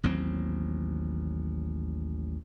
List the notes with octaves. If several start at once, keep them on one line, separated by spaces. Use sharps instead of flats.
A1 D#2 F#3 C4